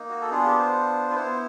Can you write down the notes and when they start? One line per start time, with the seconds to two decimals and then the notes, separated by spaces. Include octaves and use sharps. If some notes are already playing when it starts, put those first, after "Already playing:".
Already playing: A#3 D#4
0.09 F#4
0.21 A4
0.30 B3 D4 F4 G#4
0.44 G4
0.59 C5
1.10 B4
1.15 B3 E4 C5